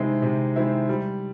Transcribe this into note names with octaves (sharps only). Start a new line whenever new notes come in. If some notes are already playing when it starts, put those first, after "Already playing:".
Already playing: C3 D#3 G#3 C4 E4
C3
D#3 G#3 C4 E4
G3